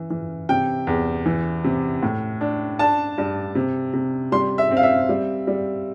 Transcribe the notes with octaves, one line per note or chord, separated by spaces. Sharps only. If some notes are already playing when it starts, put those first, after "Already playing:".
Already playing: E3
E3
C3 G5
E2
E3
C3
A2
D4
D4 A5
G2
C3
C3
G3 C6
E5
C4
F5
E5
G3
G3